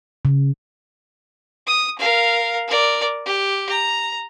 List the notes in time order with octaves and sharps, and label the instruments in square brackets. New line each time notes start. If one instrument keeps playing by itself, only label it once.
[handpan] C#3
[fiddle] D#6
A#4 F5
A#4 D5
G4
A#5